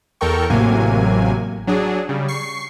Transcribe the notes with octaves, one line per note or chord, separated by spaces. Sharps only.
E2 A4 A#4 G5 C#6
A1 A2 C3 F#3 A#3 G#5
F#3 D4 G#4
C#3 G3
C#6 C7